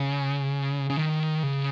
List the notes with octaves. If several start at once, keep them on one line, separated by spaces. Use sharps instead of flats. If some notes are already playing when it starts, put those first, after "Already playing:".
Already playing: C#3
C#3
D#3
C#3